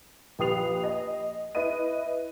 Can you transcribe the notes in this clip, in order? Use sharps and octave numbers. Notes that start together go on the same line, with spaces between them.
A#1 G4 B4 D#6 C7 F7
D#5
E4 B4 D#5 D#7